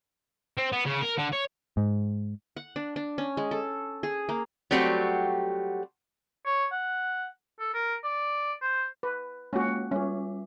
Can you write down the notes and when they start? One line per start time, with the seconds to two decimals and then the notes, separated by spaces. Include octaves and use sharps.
0.58 C4
0.72 B3
0.85 C#3
1.02 A#4
1.17 D3
1.32 C#5
1.77 G#2
2.56 F#5
2.76 D4
2.96 D4
3.18 C#4
3.37 G#3
3.51 A4
4.03 G#4
4.29 A#3
4.71 F#3 G3 A3 C4 F#4 G4
6.46 C#5
6.72 F#5
7.60 A4
7.74 A#4
8.04 D5
8.62 C5
9.03 B4
9.53 G#3 A#3 C#4 F4 F#4
9.91 G3 C#4 F4